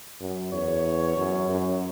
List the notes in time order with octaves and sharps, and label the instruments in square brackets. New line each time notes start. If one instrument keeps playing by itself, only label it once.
[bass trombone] F#2
[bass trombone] E2 [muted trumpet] C#5
[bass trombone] F#2
F#2